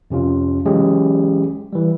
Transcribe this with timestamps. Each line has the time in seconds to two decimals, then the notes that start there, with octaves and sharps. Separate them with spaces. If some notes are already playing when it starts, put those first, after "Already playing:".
0.10 F2 C3 C#4 F4
0.65 E3 F#3 G#3 C#4 G4 G#4
1.73 E3 G3